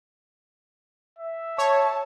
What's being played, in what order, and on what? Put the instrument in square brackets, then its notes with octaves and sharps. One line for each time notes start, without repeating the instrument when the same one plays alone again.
[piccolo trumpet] E5
[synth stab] C#5 [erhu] A5